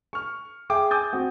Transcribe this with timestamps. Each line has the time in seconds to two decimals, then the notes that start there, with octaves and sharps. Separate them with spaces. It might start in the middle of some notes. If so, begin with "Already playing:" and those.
0.13 C#6 F6
0.70 G#4 E5 G5 D6
0.91 G#5 D6 D#6 G6 A6
1.13 C4 F#4